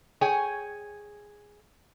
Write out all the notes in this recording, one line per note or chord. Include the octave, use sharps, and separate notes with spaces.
G#4 C#5 G5 G#5